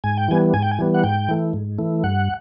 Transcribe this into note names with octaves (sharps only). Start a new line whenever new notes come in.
G#2 G#5
G5
E3 G3 B3 G#5
G#2 G#5
G5
G#5
E3 G3 B3
F#5
G#2 G5
E3 A3
G#2
E3 A3
G2 F#5